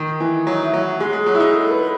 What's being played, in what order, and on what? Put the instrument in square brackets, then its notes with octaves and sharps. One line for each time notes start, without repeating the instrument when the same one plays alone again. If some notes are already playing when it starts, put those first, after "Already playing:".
Already playing: [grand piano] D#3 [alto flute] D#4
[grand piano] E3
[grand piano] F#3 [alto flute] D#4
[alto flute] E4
[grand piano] F#3
[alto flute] F#4
[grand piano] G#3 [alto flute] G#4
[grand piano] G#3
F#3
E4
D#4
[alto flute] A4
B4